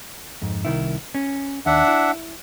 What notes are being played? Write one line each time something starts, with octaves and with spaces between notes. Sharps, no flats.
F2 G#2
C2 D#3 E4
C#4
D#2 D4 E5 F#5
E4